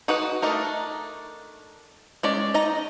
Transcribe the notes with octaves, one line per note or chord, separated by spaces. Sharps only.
D#4 F#4 B4 F#5
A3 D4 D#4 A#4
G#3 C#4 D5
D#4 D#5 A#5